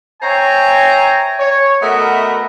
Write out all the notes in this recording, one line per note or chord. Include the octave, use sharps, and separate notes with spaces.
C5 C#5 E5 G5 G#5 A#5
C#5
A3 B3 F#4 A#4 D#5 E5